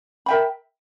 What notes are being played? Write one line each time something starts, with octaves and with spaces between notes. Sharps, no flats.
A#4 E5 G5 B5